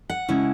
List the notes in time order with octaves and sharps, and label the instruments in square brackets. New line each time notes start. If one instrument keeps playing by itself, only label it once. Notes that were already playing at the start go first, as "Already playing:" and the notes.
[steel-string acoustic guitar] F#5
C#3 G#3 C#4 E4